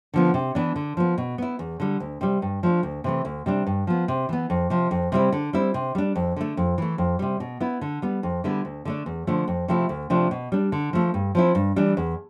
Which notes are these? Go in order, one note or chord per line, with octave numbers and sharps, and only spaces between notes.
D3 F3 B3
C3
E3 B3 D4
D3
F3 B3
B2
B3 E4
E2
D3 G3
D2
C3 G3
G2
F3 A3 D4
D2
C3 E3 A3
D2
C3 G3 D4
G2
F3 B3
C3
E3 B3
F2
C3 F3
F2
C3 G3 C4 E4
D3
G3 C4 E4
C3
G3 D4
F2
D3 A3
F2
E3 A3
F2
C3 G3
B2
B3 E4
D3
G3 B3
F2
D3 G3 B3 E4
D2
D3 A3 D4
E2
D3 F3 A3
F2
C3 F3 A3 E4
D2
C3 F3 A3 D4
B2
G3 D4
D3
F3 A3
G2
F3 C4 E4
G2
E3 G3 D4
E2